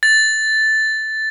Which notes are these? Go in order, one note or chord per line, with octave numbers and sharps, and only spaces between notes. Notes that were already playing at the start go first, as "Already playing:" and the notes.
A6